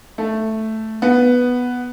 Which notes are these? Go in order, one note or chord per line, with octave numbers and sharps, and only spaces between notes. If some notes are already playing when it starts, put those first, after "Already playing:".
A3
B3